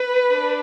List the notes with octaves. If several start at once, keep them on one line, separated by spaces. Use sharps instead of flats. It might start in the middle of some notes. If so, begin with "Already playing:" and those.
Already playing: B4
D4